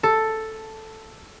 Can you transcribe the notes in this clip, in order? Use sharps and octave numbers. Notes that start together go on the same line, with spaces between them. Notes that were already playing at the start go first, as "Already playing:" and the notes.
A4